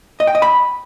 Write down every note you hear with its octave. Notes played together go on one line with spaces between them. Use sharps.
D#5
G5
D#5
B5